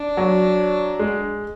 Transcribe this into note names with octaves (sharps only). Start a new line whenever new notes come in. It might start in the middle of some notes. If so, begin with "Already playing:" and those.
Already playing: D4
F#3
G#3